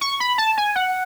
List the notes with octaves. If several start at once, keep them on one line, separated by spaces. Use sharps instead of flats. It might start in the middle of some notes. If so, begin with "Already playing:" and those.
C#6
B5
A5
G#5
F#5